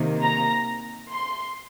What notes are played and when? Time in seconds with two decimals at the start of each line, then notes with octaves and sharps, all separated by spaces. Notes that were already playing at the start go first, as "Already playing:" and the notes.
Already playing: C3 D#3 A#3
0.23 A#5
1.12 C6